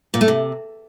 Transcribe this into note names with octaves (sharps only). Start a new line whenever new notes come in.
A#2
A3
C3